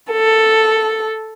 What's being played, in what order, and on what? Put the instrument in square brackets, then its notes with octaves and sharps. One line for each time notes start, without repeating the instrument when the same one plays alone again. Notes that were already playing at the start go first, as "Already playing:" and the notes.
[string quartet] A4